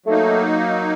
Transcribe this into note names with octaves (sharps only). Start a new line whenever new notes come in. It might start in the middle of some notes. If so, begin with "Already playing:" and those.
F#3 A3 A#3 D#4